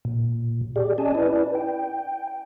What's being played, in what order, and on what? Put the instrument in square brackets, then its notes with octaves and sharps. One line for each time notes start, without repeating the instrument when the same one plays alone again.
[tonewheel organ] A#2
G4 G#4 D5
C#4 D5 D#5 G#5 A5
E4 B4 D5
G5